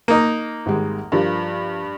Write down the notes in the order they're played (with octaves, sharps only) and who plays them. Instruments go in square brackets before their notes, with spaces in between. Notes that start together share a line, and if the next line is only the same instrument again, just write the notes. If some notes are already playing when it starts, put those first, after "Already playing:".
[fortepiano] A#3 D#4
[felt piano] G#1 G3 G#3
[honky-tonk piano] G2 [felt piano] F3 A#4